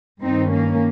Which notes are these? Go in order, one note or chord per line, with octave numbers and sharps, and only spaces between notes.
G2 D#3 C4 D#4
A#3 C#4